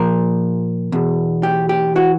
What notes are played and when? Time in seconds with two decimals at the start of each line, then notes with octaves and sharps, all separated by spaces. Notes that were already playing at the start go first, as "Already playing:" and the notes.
Already playing: A#2 F3 A#4
0.92 E2 B2
1.43 G4
1.69 G4
1.96 E3 F#4